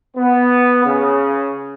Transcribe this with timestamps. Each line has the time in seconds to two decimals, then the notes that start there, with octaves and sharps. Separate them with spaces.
0.17 B3
0.86 C#3